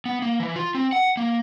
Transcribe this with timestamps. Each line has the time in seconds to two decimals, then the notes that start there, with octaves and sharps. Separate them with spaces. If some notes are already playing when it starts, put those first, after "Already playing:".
0.06 B3
0.22 A#3
0.40 E3
0.56 F4
0.75 C4
0.93 F#5
1.17 A#3